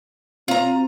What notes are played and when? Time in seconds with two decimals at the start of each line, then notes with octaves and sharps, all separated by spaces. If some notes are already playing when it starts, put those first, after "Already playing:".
0.48 C4 F4 A#5